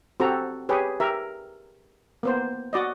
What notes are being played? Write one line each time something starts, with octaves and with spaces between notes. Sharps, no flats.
C4 F#4 G4 A4 A#5
G4 G#4 B4 C#5
G4 A#4 E5
A#3 B3 C5
F#4 D5 D#5